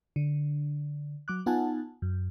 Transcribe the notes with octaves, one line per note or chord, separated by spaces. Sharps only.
D3
F#3 D6 F#6
B3 D#4 F4 F#5 G#5 A5
F#2